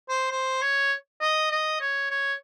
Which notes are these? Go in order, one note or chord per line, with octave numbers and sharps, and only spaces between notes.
C5
C5
C#5
D#5
D#5
C#5
C#5